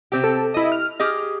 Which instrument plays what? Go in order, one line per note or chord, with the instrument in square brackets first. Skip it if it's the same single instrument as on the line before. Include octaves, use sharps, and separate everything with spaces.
[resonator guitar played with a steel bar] C3 C4 G4
[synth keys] A4
E4 D#5
F6
[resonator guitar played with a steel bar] G4 G#4 D#5